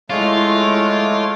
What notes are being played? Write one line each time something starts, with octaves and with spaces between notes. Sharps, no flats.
G#3 A3 E4 F4 C#5 D6